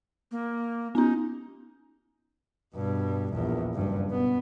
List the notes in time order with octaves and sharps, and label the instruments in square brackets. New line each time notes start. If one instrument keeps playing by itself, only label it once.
[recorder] A#3
[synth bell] B3 C#4 [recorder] D#4
[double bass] G2 B2
A#1 E2
F#1 G2
B2 B3